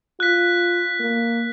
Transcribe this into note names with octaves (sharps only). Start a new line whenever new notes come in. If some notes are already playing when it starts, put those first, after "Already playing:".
F4 F#6 B6
A#3